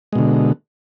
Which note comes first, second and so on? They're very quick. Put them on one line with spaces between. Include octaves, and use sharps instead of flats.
G#3 B2 D3